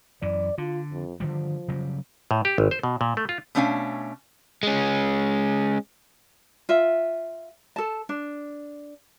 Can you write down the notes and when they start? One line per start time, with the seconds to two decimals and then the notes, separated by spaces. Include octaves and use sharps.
0.22 F#2 E3 D5
0.58 D3 F4
0.92 F2
1.20 D3 D#3 F3 G3
1.68 C#3 F#3 G3
2.31 A2
2.45 G4
2.58 G#1
2.71 C5
2.83 B2
3.01 A#2
3.17 A3
3.29 F4
3.55 B2 A3 C#4 D4 F5 G#5
4.63 G#3 C#4
6.69 F4 E5
7.76 A4 A5
8.09 D4